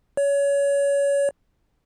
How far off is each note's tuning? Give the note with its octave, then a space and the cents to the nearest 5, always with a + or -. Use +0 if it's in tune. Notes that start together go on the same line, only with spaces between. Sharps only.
C#5 +25